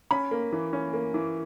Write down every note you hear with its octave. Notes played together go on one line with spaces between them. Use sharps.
C#4 B5
A#3
E3
C#4
A#3
E3